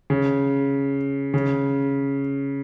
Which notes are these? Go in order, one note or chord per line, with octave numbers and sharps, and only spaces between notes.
C#3
C#3